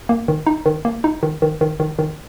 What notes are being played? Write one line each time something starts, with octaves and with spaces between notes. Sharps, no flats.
A#3
D#3
D#4
D#3
A#3
D#4
D#3
D#3
D#3
D#3
D#3